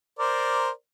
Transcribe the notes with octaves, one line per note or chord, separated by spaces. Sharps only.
A#4 C5 D5